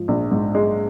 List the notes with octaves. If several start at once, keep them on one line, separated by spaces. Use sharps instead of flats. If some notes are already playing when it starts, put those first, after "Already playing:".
Already playing: G#2 F3
A#1
G#2
G#3